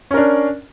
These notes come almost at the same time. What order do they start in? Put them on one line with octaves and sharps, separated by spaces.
C#4 A#4 D4